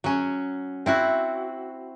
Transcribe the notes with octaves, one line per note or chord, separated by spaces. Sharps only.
F#3 C#4
C4 E4 F#4